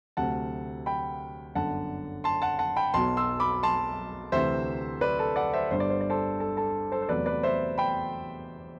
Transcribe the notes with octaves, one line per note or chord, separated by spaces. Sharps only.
D2 C3 F#3 F#5 A5
G5 B5
G1 F#2 D3 F#5 A5
A5 C6
F#5 A5
F#5 A5
G5 B5
B1 B2 F#3 A5 C6
C6 E6
B5 D6
A5 C6
D2 C3 E3 C5 E5
B4 D5
A4
D5 F#5
C5 E5
G1 G2 D3 G3 C5
D5
C5
D5
A4 C5
A4
A4
A4 C5
C5
E2 C3 F#3 A3 B4 D5
B4 D5
C5 E5
G5 B5